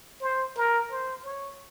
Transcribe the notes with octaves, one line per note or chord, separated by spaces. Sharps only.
C5
A#4
C5
C#5